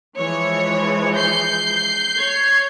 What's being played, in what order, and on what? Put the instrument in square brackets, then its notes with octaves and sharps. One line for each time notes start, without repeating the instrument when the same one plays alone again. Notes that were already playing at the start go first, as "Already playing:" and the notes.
[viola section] E3 F3 G#3 [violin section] C#5
[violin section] G6 C7
[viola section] C#5 [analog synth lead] G#6